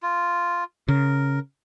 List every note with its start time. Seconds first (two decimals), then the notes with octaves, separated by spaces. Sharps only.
0.03 F4
0.88 C#3 A#4